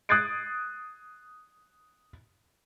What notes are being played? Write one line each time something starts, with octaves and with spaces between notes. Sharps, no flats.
D#6 F#6 G#6 A6 C7 D7